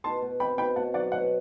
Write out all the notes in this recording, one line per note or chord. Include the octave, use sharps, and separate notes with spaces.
B2 A5 C6
B2
C4 G5 B5
B2 G5 B5
B2 F#5 A5
F#3 D5 F#5
B2 D5 F#5